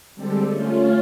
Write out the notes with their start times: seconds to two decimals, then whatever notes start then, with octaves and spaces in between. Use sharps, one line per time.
0.15 D3 G3 G#3 C4 G4 A4
0.48 A3 C#4 F4